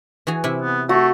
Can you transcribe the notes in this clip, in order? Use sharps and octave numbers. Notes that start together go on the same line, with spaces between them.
E3 F#4 G#4
C3 E4
B3
A3 F#4